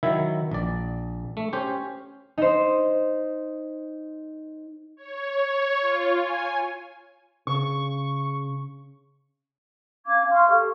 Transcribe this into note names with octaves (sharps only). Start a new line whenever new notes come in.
D#3 F#3 E4 E5
A#1 D5
A3
C#4 G4 C5
D#4 C5
C#5
C#5
F4
G#5
C#3 C#6
C#4 F5 D6 G#6
F5 C6 C#6 F6
G4 A4